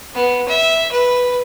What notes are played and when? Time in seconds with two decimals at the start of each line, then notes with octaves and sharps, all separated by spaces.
0.15 B3
0.48 E5
0.92 B4